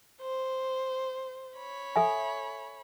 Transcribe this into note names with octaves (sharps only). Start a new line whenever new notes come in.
C5
C#5 B5
A4 E5 G#5